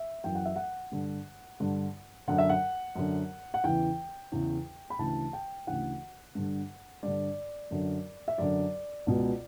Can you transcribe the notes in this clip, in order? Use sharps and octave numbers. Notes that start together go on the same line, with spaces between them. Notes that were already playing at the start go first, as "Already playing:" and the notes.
Already playing: E5
F#2 E3 G5
F#5
E5
F#5
G2 D3
G2 D3
F#2 D3 F#5
E5
F#5
F#2 D3
F#5
E2 C#3 E3 G5
E2 C#3 E3
B5
D2 C#3 E3 A5
G5
D2 C#3 E3 F#5
G2 D3
G2 D3 D5
F#2 D3
E5
F#2 D3 D5
C#2 B2